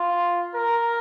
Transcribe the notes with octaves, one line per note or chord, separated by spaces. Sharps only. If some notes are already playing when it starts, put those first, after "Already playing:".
Already playing: F4
A#4